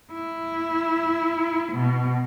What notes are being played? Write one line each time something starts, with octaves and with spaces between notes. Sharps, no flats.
E4
B2